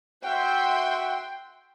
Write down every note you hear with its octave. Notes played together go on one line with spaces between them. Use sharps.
F#4 E5 F#5 G5 C6